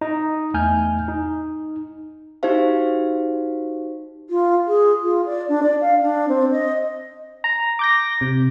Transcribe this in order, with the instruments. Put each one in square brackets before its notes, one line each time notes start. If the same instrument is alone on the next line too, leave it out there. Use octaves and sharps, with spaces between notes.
[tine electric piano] D#4
E2 A3 G#5 F6 G6
D#4
[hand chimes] D#4 F#4 G4 C5 F5
[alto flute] F4
G#4
F4
D5
D4
D5
F5
D4
C4
D#5
[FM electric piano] A#5
D6 G6 A#6
C3